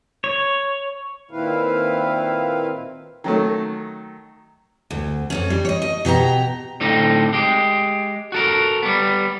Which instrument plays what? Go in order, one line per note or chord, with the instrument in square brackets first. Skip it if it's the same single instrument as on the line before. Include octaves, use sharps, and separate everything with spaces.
[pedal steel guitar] C#5
[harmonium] A#2 D#3 C4 E4 B4 F5
[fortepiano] D#3 F#3 A3
[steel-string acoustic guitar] D2
F2 G#2 C#4
G3
C#5 D#5
D#5
B2 G4 D#5 A#5
[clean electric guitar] A2 D3 C4 D#4
G#3 G4
F#4 A4 A#4
G3 B3